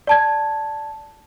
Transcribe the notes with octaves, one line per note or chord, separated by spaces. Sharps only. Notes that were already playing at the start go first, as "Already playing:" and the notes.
D5 A5 G#6